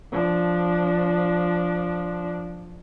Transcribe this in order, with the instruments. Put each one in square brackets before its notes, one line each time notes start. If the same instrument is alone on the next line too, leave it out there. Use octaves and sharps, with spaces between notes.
[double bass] F3 D4